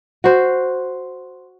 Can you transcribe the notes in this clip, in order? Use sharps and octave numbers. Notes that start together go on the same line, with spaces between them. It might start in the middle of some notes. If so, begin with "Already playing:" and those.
F#4 C5